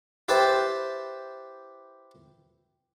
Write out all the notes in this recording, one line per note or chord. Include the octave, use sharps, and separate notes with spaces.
E4 G4 B4 C5 A5